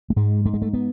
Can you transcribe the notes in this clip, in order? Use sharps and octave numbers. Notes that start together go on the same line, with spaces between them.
A3
G#2 G#3
G#2 A3
G#3
A3
B3